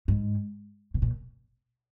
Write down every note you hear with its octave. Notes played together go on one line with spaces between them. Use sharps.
G#2
B2
A#2